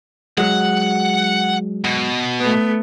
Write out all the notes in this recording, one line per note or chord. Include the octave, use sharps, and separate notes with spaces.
F#3 G#3 F#5
B2
A3 B3